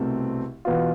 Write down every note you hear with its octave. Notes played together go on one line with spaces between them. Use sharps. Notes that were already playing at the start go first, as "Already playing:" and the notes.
Already playing: C2 B2 A3 C4
E2 B2 B3 F4